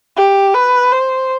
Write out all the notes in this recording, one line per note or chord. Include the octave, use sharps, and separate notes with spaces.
G4
B4
C5